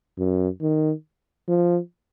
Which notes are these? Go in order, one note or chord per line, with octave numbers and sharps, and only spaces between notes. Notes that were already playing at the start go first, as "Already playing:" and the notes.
F#2
D#3
F3